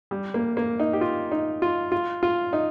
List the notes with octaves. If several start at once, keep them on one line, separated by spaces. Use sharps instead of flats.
G3
A#3
A#3
D#4
G4
F4
D#4
F4
F4
F4
D#4